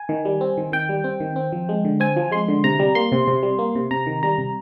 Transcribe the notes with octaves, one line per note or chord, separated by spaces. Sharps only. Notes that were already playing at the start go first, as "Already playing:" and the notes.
Already playing: G#5
D#3
G3
C4
D#3
D#3 G5
G3
C4
D#3
C4
F3
G#3
D3
C4 G#5
F3
G#3 C6
D3
C3 A#5
G3
A#3 C6
C3
C3
G3
A#3
C3
C3 A#5
D#3
G3 A#5
C3